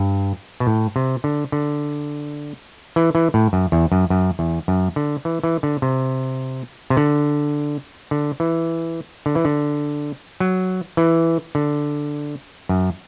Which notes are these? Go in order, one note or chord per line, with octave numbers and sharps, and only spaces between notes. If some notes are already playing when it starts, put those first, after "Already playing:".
Already playing: G2
B2
A2
C3
D3
D3
E3
E3
A2
F#2
E2
F#2
F#2
E2
F#2
D3
E3
E3
D3
C3
C3
D3
D3
E3
D3
E3
D3
F#3
E3
D3
F#2